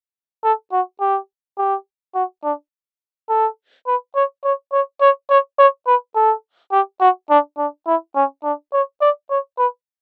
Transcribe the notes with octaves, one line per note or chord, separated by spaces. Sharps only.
A4
F#4
G4
G4
F#4
D4
A4
B4
C#5
C#5
C#5
C#5
C#5
C#5
B4
A4
G4
F#4
D4
D4
E4
C#4
D4
C#5
D5
C#5
B4